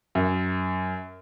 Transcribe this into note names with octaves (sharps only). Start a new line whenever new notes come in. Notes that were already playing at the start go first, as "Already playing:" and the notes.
F#2